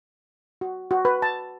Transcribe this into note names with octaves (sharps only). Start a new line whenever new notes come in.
F#4
F#4
B4
A5